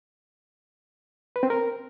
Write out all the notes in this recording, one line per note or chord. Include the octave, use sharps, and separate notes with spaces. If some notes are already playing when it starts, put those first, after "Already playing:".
B4
C4
A#4